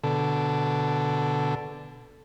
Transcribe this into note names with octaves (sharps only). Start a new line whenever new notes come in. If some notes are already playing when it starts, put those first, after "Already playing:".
B2 D3 A4